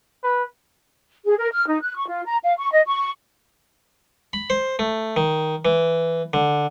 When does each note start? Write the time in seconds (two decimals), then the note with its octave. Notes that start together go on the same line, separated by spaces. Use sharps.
0.24 B4
1.26 G#4
1.38 A#4
1.52 F6
1.67 D#4
1.81 F#6
1.96 C#6
2.08 F4
2.26 A#5
2.43 F5
2.57 C#6
2.71 D#5
2.87 C#6
4.33 B5
4.50 C5
4.79 A3
5.16 D#3
5.65 E3
6.33 D3